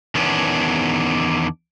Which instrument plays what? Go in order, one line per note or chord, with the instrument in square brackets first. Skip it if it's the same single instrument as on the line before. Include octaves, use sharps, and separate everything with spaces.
[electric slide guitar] E2 D#3 B3 C#4 D4